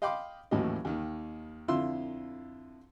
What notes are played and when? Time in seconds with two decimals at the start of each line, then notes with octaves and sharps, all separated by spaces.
0.02 D#5 F5 G5 B5 C6 D6
0.51 D#2 A2 E3 F#3 C#4 D#5
0.85 D#2 D#3
1.68 F2 D3 E4 F4 C6 E6